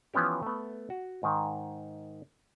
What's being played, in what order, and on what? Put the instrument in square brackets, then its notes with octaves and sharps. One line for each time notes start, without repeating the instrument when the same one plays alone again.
[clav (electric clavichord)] E3 F3 B3 C#4 G4
A3 B3
F#4
G#2 D#3